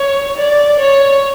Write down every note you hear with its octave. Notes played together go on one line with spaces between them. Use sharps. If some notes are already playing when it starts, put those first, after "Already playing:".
Already playing: C#5
D5
C#5